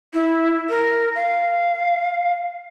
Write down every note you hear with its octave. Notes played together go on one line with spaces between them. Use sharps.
E4
A#4
F5